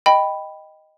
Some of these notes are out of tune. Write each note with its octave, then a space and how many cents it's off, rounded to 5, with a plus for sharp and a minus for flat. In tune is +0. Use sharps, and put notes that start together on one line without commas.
D#5 +0 G5 +0 B5 +0